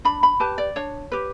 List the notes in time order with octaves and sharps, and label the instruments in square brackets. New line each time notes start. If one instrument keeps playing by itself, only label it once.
[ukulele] D4 B5
B5
G4 B4 A5
D5
D4 C#5
G4 B4